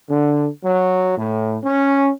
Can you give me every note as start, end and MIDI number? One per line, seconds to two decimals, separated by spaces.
0.10 0.48 50
0.65 1.16 54
1.18 1.58 45
1.64 2.09 61